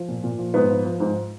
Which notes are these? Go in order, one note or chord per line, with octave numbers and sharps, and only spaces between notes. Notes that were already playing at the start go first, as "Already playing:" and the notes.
Already playing: F3
A#2
A#2
F3
G#2 B3
F3
F3
G#2